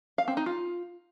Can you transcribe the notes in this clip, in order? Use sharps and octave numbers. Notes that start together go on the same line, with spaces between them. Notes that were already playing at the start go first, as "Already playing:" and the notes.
F5
C4
D#4
F4